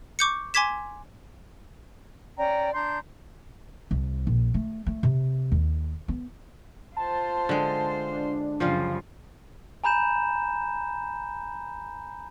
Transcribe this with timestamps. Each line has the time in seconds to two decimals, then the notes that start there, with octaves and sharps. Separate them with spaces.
0.19 C#6 D6 G6 C#7
0.54 G#5 C6 D6 G#6 B6 E7
2.38 C#4 D5 G5 A#5
2.74 D4 A#5 C6 G6
3.91 C2
4.27 A#1
4.54 A3
4.86 A3
5.03 C3
5.51 D#2
6.08 B3
6.97 F4 C5 A5
7.49 D3 G#3
8.10 D4
8.60 F#2 C#3 F3 G3 F4
9.84 G#5 A#5 B5 G6 E7